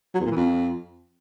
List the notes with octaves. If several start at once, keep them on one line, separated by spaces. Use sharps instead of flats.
F#3
E2
A#2
E3
F2